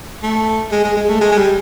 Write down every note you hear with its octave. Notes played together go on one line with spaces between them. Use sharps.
A3
G#3
G#3
G#3
A3
G#3
G#3
G3